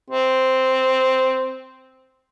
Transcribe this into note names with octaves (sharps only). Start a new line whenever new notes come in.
C4